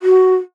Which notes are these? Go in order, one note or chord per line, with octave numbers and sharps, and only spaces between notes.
F#4